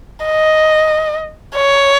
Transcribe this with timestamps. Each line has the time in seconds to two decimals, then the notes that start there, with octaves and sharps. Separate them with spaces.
0.25 D#5
1.56 C#5